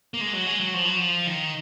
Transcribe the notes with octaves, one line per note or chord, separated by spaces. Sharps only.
A#3
G#3
F#3
G#3
F#3
F3
F#3
F3
D#3